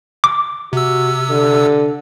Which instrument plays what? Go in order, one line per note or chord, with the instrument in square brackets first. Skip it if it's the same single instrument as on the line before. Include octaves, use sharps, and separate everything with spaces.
[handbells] D6
[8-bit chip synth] C3 E6 [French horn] F#4
[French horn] D3